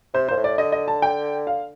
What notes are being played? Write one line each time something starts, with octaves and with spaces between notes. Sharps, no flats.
C3 C5
A#2 C5
A2
D5
D3 D#5
D#5
A5
G5
F5